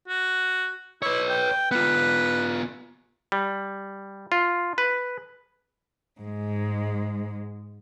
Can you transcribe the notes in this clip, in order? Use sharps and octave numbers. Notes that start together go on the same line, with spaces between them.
F#4
E4 B4 C#5
G5
B3 F4 B4
G3
F4
B4
G#2 G#3